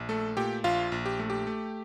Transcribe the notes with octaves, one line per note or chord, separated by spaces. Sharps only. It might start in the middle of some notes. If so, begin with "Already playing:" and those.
Already playing: A#1
A3 A4
A#2 G4 G5
A#1 F4 F5
A#1
G4
A3
G4
A3